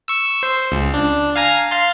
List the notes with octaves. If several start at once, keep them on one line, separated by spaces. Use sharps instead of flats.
C#6 E6
C5
C#2
D4
F5 G#5 A#5
F5 C6 A6